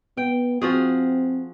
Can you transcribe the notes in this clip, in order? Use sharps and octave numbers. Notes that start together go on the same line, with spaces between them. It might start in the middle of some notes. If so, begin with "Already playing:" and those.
B3 G5
F3 C4 F#4 G#4